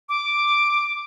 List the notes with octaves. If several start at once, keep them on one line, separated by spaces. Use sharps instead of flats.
D6